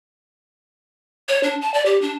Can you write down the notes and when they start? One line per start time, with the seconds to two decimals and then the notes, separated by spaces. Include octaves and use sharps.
1.29 C#5
1.43 D4
1.62 A5
1.74 D5
1.86 G4
2.02 D4